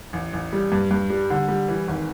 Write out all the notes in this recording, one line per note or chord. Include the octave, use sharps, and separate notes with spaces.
A1
A1
G3
G2
G2
G3
D3
G3
E3
G#1